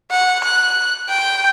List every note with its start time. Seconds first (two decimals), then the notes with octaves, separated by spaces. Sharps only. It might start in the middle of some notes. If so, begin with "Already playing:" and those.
0.11 F#5
0.44 F#6
1.09 G5